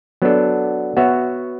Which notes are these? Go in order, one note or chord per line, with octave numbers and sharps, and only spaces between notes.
F#3 B3 D4 A4
B3 F#4 C#5 E5